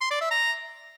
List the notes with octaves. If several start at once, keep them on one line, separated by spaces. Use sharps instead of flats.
C6
D5
E5
A#5